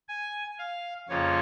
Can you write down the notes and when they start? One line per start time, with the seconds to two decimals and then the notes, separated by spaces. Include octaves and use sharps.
0.09 G#5
0.59 F5
1.09 F2 C#3 F3 A#3 F4 C#5